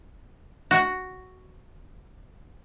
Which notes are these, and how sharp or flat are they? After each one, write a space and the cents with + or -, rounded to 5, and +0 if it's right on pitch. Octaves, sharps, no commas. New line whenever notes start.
F#4 +5